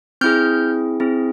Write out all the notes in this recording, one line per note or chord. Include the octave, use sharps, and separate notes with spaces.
C4 E4 G#4 F6 G6
C4 E4 G#4